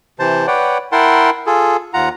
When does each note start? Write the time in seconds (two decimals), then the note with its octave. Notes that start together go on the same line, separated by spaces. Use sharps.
0.19 C3 E3 C5 A5
0.47 B4 C#5 D5 F#5 G5
0.92 E4 A#4 F#5 G5 A5 C6
1.46 F4 G#4 A4
1.94 D#2 F4 F#5 A#5